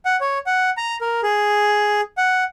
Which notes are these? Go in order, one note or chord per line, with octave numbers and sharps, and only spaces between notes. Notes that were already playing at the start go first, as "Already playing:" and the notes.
F#5
C#5
F#5
A#5
A#4
G#4
F#5